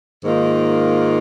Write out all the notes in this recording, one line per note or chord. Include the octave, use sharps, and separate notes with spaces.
G#2 D#3 A#3 F4